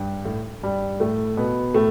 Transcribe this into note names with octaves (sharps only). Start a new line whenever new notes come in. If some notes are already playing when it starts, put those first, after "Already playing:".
Already playing: G2
A2
G2 G3
A2 A3
B2 B3
A2 A3